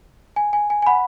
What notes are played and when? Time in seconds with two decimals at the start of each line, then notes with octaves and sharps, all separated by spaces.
0.36 G#5
0.53 G#5
0.70 G#5
0.82 G#5
0.86 F#5 B5